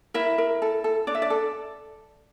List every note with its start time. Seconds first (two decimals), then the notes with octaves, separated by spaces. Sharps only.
0.14 E4 A#4 E5
0.38 A#4
0.62 A4
0.84 A4
1.07 D4 D5
1.15 E5
1.22 D5
1.30 A4